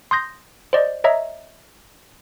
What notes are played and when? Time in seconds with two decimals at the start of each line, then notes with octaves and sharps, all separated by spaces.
0.11 C6 D#6 G6 A#6
0.73 C5 D5 D#5
1.04 C#5 D#5 E5 A#5